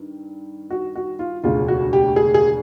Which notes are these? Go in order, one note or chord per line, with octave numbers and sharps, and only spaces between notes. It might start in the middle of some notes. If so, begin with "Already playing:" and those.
Already playing: G2 D#3
F#4
F#4
F4
E1 D2 C#3 F4
F#4
G4
G#4
G#4